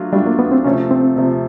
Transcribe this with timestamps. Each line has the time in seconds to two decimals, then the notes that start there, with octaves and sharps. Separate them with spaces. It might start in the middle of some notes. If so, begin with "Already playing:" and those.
Already playing: F#3 A3 D4 F4
0.13 F#3 G3 A3 D4 F4
0.27 A#3
0.39 B3
0.51 C4
0.64 C3 F3 A3 C#4
0.91 C4
1.16 C3 F3 A3